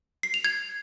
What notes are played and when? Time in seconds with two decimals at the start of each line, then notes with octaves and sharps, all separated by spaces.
0.23 C7
0.34 F7
0.44 G#6